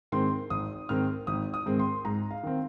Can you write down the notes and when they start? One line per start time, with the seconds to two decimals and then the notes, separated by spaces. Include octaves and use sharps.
0.12 G#2 D#3 G#3 C4 C6
0.50 G#1 D#6
0.89 G#2 D#3 G#3 C4 F6
1.27 G#1 D#6
1.54 D#6
1.66 G#2 D#3 G#3 C4
1.79 C6
2.05 G#2 A#5
2.31 F5
2.43 D#3 C4